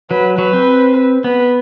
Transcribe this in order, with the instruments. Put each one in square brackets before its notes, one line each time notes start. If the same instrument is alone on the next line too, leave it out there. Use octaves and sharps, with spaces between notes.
[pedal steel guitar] F#3 [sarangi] B4
[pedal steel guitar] F#3 [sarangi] B4
[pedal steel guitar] C4
[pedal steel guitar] B3 [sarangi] B4